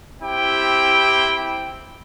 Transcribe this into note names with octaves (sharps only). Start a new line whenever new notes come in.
C4 E4 G4 G5